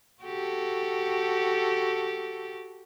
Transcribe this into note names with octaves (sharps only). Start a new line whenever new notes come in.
F#4 G4 A4